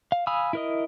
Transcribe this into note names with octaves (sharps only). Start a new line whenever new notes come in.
F5
F5 G#5 B5 D#6 E6
E4 A#4 D#5